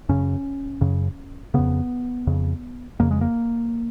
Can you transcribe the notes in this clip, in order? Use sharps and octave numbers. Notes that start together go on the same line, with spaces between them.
F#2 C#3 C#4
F#2 C#3
F2 C#3 B3
F2 C#3
F2 C#3 A#3
G#3
A#3